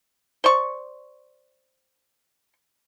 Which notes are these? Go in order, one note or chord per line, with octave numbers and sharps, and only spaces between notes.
C5 D5 C#6